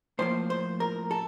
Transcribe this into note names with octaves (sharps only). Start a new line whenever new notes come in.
A2 F3 A#3 C5
C5
A#4
A4